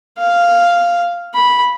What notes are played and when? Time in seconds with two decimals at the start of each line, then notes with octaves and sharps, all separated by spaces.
0.18 F5
1.34 B5